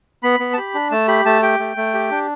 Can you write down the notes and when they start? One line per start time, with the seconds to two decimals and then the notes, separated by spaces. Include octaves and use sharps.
0.23 B3 B5
0.40 B3
0.53 A5
0.57 G4 B5
0.74 D4
0.91 A3 A5
1.08 G4 B5
1.25 A3 A5
1.42 G4 G5
1.60 A3
1.77 A3
1.94 G4
2.11 D4